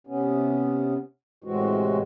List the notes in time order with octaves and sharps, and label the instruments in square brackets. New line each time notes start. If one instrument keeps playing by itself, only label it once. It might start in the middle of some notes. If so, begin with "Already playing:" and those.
[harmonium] C3 B3 C#4
A2 C3 E3 G#3 C4 F#4